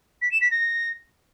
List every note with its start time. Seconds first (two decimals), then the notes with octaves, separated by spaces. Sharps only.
0.21 B6
0.31 E7
0.41 B6
0.51 A#6